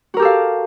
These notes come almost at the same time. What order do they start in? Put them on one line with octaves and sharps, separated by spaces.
F#4 A#4 G4 A4 F5